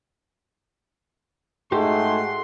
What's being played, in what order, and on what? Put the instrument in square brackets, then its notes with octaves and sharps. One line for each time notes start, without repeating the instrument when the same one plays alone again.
[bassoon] G#2 [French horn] A3 [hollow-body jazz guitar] F#4 G4 [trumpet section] F#5 C6